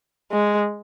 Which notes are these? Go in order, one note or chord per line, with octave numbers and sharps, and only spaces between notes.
G#3